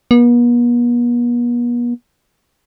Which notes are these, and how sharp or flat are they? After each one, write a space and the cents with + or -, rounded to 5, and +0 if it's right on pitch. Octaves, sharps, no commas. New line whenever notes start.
B3 -45